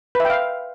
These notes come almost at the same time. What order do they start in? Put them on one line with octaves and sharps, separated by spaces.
B4 E5 G5 F5